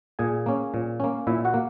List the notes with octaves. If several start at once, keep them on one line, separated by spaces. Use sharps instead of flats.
A#2 G#4 G#5
A#3 C#4
A#2
A#3 C#4
A#2 E4 E5
F#4 F#5
A#3